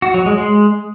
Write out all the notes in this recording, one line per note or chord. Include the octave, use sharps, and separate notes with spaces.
F#4
F#3
G#3
G#3